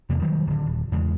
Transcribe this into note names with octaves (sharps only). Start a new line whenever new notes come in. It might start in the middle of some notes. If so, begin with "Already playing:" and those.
E2 C3 A#3
D#3 F#3 G3
D1 D3
D#1
E2 C#3 G#3